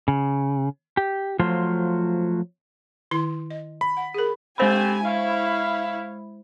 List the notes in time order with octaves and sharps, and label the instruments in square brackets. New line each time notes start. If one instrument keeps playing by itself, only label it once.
[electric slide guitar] C#3
G4
F3 F#3 A3 F4 C5
[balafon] D#3 E4 C6
D#5
[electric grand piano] B5
[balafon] F#5
G#4 A#4
[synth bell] G#3 C5 B5 [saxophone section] A3 C4 [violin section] G4 G#5
[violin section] E4 [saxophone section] C#5 F5